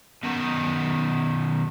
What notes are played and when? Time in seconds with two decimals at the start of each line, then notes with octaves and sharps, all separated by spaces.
0.24 B2 D#3